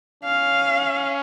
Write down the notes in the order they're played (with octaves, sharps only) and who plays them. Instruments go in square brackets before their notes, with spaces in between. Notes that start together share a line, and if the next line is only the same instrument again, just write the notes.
[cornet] C#4 [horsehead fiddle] F5